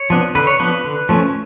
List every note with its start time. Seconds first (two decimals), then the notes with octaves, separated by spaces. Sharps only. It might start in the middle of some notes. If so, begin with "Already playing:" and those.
Already playing: C#5
0.10 F3 B3 D4
0.35 D3 B4
0.47 C#5
0.60 F3 B3 D4 B4
0.84 D3
1.09 F3 A3 C#4